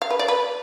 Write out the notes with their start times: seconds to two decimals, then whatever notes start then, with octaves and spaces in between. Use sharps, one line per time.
0.02 F5
0.10 B4
0.19 D5
0.28 B4